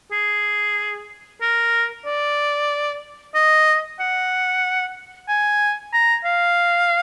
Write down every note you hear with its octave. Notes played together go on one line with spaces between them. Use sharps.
G#4
A#4
D5
D#5
F#5
G#5
A#5
F5